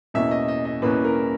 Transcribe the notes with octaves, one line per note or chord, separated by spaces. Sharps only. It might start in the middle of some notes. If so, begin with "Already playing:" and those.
E2 B2 A#3 C#4 E5
D#5
D#5
D#5
E2 B2 A#3 C#4 B4
A#4